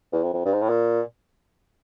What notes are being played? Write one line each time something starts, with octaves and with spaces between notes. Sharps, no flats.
E2
F2
F2
G2
G#2
A2
A#2